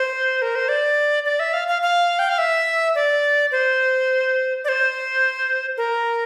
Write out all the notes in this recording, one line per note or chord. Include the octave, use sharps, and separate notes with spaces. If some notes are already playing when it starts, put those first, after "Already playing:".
Already playing: C5
A#4
C5
D5
D5
E5
F5
F5
F5
G5
F5
E5
D5
C5
D5
C5
A#4